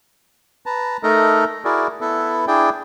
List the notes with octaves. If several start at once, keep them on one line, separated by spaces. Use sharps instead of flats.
B4 A5 A#5
A3 D#4 A4 A#4 D#5 A#5
E4 F#4 G#4 A#4 D5
B3 E4 A4 B4
D4 E4 G#4 D5 G5